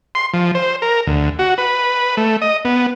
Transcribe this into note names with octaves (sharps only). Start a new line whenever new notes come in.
C6
F3
C5
A#4
D2
F#4
B4
A3
D#5
B3